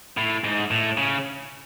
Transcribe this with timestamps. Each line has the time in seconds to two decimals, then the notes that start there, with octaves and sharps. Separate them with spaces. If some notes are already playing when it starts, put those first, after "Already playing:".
0.18 A2
0.44 G#2
0.71 A2
0.97 C#3